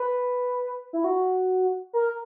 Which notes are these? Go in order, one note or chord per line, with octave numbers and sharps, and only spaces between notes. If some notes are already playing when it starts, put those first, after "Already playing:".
Already playing: B4
E4
F#4
A#4